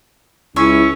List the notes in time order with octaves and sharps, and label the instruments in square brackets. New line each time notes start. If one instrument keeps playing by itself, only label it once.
[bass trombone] C#2 [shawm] C#4 [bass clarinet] E4 [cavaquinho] C#5 E5 C6